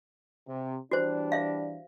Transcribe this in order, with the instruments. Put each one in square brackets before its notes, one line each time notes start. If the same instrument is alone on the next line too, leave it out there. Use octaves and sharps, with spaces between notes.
[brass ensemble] C3
[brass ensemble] E3 G3 D4 [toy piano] F#4 C5
[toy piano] E5 F5